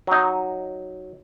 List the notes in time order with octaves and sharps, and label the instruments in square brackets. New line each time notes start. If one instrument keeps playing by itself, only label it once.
[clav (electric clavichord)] F#3 D#4